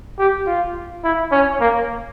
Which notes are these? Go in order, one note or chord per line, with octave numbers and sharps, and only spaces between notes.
G4
F4
E4
C#4
A#3